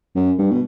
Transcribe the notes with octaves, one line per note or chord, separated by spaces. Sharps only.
F#2
G2
B2